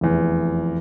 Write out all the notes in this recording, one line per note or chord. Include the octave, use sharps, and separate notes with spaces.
F1 E2